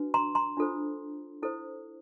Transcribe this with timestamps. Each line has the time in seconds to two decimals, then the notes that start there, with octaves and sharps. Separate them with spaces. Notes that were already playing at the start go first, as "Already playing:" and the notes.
Already playing: D4 F#4 B4
0.14 A#5 C6
0.35 A#5 C6
0.57 D4 F4 A4 C5
1.43 E4 A4 C5